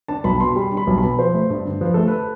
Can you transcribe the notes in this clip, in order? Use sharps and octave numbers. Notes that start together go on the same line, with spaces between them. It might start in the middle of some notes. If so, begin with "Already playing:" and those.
D4 A5
B1 B5
B2 C6
G3 B5
D4
B5
B1
B2 B5
F3 C5
A3
G2
D3
F3 B4
A3 A4
B4